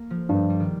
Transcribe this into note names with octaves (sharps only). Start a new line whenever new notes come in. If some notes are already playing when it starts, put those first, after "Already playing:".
Already playing: A#3
F3
G2 G3
G3
D#3